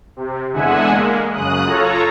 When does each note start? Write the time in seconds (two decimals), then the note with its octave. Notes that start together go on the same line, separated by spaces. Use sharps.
0.16 C3
0.53 E2 D3 G#3 E5 F#5 G#5
0.91 G#3 A#3
1.33 F#2 C#3 D#6 F#6
1.65 F4 A4 C#5 A#5